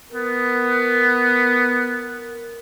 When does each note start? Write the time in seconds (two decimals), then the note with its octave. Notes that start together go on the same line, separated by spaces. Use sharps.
0.14 B3 A#4